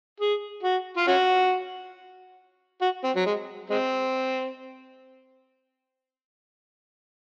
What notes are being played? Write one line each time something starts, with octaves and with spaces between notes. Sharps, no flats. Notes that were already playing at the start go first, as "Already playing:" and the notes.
G#4
F#4
F4
C#4 F#4
F#4
C4
F#3
G#3
G#3 C4